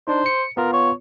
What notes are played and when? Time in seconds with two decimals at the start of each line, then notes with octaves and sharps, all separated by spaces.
0.08 D4 D#4 C5
0.26 C#7
0.57 B3 F4 A#4
0.73 C#5